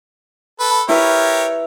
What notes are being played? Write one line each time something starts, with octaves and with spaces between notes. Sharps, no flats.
A4 B4
E4 G4 A#4 B4 C#5